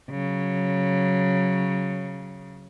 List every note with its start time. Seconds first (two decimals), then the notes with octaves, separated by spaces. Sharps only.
0.10 C#3 F#3